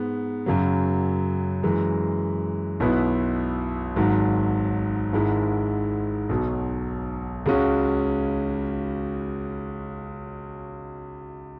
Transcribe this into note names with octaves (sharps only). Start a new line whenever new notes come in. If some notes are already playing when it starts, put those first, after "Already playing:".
Already playing: G#2 G#3 B3
F#2 C#3 F#3
F#2 E3 G#3
B1 B2 B3 E4 B4
G#1 G#2 F#3
G#1 G#2 G#3 E4
B1 B2 F#3
C#2 C#3 G#3 C#4 F#4